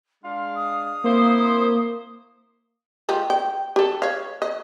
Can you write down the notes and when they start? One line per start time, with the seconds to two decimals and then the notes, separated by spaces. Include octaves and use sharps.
0.24 G#3 D4 F5 C6
0.55 D#6
1.04 A#3 C4 E4 C5
3.09 G#3 F4 G4
3.30 G5
3.76 G4 A4
4.02 C#5 F5
4.42 D#5